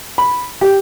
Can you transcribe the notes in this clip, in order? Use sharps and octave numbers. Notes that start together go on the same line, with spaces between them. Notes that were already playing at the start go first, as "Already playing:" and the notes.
B5
G4